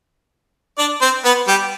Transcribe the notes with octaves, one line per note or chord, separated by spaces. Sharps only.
D4 D5
C4 C5
B3 B4
G3 G4